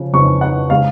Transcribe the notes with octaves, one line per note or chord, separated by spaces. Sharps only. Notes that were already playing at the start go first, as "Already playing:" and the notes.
Already playing: C#3 F3
F2 C#3 F3 C#6
F#5
C#3 G#3 F5